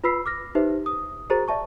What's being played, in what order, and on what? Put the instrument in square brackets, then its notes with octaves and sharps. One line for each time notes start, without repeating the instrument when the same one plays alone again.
[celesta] F4 B4 B5 E6 B6 C7
D6 F6 A#6
D#4 G4 B4 C5 E5
D#6
F#4 G#4 A#4 C5 A#5 A6
D5 E5 A5 C#6